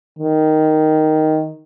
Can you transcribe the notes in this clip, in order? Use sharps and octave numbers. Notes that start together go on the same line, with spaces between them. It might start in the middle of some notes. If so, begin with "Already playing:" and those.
D#3